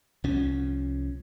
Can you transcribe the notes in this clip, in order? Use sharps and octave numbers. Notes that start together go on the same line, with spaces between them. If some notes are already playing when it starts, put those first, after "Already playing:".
C2 F3 C#4